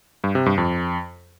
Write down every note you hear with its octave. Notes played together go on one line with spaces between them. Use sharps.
G2
C3
G2
F2